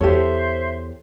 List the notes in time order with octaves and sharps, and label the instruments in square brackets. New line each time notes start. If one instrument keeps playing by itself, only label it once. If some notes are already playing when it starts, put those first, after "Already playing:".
[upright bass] E2 [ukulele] G4 A4 C#5 [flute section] C5 E5